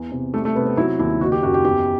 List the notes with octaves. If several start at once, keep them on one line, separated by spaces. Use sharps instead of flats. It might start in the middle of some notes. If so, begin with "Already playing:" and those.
Already playing: E2
C3
G3 A3
A3
C3 B3
C4
F#3 E4
D#2 E4
F#1 F#4
G4
F#2 F#4
G4
E2 G4